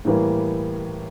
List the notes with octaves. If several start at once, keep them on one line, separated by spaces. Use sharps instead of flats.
A2 E3 G3 A#3